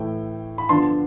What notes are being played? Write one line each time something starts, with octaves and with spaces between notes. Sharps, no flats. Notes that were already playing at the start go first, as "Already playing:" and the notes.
Already playing: A2 E3 A3 G5
B5
D3 F3 B3 D4 A5 C6